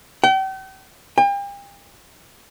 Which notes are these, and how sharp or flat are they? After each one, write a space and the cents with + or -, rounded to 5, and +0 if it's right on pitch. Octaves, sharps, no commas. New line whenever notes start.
G5 -40
G5 +40